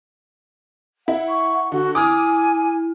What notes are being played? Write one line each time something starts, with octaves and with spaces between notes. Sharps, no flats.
E4 F#5
C#6
D3 F#4
E4 G#5 D6 D#6 F6